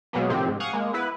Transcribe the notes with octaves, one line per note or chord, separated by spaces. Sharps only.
B2 F#3 G#3 A#3 B3
A2 C3 D#3 F3 C4 G4
G#2
F5 F#5 G#5 C#6 D#6
G#3 A#3
B3 E4 B4